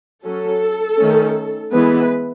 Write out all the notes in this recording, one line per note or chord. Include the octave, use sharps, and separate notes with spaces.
F#3 C#4 A4
D#3 A3 C#4
E3 G#3 B3 B4